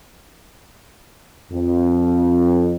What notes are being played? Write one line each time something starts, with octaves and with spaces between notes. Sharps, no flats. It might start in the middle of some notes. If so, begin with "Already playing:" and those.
F2